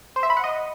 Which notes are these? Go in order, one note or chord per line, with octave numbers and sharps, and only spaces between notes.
C5
E5
B5
F#5
D#5